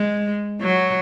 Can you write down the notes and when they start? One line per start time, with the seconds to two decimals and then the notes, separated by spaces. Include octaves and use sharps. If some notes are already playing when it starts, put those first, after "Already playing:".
Already playing: G#3
0.61 F#3